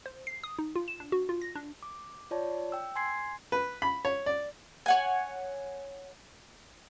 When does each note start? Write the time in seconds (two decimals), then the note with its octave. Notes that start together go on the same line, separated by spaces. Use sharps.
0.06 C5
0.27 C7
0.44 D#6
0.59 D#4
0.76 F4
0.88 E7
1.00 D4
1.12 F#4
1.29 F4
1.41 A#6
1.56 D4
1.83 D6
2.31 F4 C#5 D5 A5
2.72 G5 E6
2.96 G#5 C6 G#6 C7
3.52 B4
3.82 B5
4.05 C#5
4.26 D5
4.86 C#5 F#5 G#5